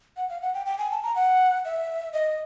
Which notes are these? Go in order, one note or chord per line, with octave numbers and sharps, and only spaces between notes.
F#5
F5
F#5
G5
G5
G#5
A5
A#5
F#5
E5
D#5